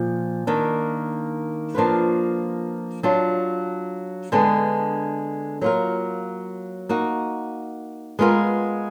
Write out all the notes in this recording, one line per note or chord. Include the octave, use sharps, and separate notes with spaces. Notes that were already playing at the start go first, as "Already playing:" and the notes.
Already playing: A#2 F3
D#3 A#3 D4
F3 A#3 D4 F4 B4
F#3 D4 F4
D3 G#3 B3 D4
F#3 A#3 F4 A#4
A#3 D#4 F#4
G#3 B3 F4 A#4